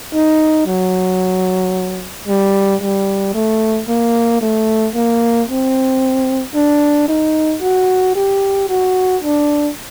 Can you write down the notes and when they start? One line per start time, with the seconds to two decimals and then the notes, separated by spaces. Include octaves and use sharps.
0.14 D#4
0.66 F#3
2.28 G3
2.81 G3
3.34 A3
3.88 A#3
4.41 A3
4.95 A#3
5.48 C4
6.55 D4
7.08 D#4
7.63 F#4
8.16 G4
8.69 F#4
9.23 D4